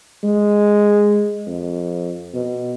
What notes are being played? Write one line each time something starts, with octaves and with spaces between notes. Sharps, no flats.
G#3
F2
B2